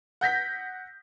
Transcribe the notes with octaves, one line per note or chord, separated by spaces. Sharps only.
F#5 G6 A#6 B6